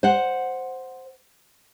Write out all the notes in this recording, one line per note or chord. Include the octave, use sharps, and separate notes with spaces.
C5 F#5